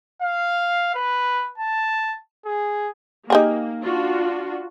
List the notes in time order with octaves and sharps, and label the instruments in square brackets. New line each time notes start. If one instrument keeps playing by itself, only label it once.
[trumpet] F5
B4
A5
G#4
[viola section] A#3 [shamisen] D#4 G4 G#4
[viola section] D4 F4 F#4